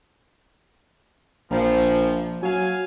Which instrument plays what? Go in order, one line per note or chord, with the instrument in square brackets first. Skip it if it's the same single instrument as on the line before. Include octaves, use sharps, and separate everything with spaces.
[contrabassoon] A#1 [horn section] F3
[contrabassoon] F#3 [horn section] F5 G#5